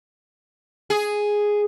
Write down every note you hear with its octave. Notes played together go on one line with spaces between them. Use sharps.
G#4